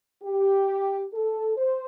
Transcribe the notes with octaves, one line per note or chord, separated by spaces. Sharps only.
G4
A4
C5